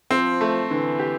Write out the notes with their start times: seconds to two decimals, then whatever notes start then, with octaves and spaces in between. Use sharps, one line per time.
0.11 F3 C4
0.41 A3
0.70 D3 E3
0.99 G4